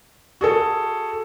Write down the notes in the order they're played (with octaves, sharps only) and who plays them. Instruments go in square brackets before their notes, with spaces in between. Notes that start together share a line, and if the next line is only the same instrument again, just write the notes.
[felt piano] F#4 G#4 A4